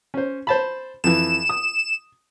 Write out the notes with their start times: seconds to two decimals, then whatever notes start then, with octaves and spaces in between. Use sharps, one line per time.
0.14 C#4 C5
0.47 C5 A5 B5
1.04 F2 E3 E7
1.49 D#6